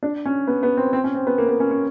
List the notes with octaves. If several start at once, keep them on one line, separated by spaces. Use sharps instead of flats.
D4
C#4
B3
B3
C4
C4
C#4
C4
B3
A#3
B3
C#4
C#4